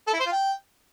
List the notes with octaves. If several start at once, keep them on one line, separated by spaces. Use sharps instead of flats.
A4
E4
C5
F4
G5